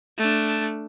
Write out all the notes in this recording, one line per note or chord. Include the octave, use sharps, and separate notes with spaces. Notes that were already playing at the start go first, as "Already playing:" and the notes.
A3 D4